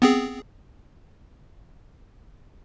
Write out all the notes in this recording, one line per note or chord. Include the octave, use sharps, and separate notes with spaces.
B3 C4 G#4